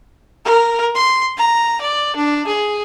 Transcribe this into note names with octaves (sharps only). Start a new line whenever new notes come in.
A#4
C6
A#5
D5
D4
G#4